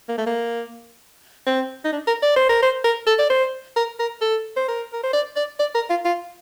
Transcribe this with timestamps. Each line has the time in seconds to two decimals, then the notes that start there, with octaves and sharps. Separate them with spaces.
0.09 A#3
0.18 A3
0.27 A#3
1.47 C4
1.85 D#4
1.93 D4
2.07 A#4
2.23 D5
2.36 C5
2.49 A#4
2.63 C5
2.84 A#4
3.07 A4
3.19 D5
3.30 C5
3.76 A#4
3.99 A#4
4.21 A4
4.57 C5
4.68 A#4
4.93 A#4
5.03 C5
5.13 D5
5.36 D5
5.60 D5
5.75 A#4
5.90 F4
6.05 F4